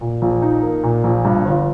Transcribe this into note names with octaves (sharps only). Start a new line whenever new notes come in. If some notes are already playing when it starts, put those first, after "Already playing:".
A#2
A#1
D#4
A#3
A#2
A#1
G2
G1